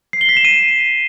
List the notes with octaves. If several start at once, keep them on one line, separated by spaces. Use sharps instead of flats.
C7
G7
B6
E7
D#7